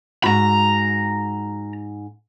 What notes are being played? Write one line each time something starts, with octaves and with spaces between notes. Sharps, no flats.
G#2 F#4 A#5 B5